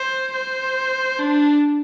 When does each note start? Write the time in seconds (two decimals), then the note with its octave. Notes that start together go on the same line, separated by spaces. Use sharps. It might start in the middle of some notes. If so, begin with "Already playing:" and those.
Already playing: C5
0.34 C5
1.19 D4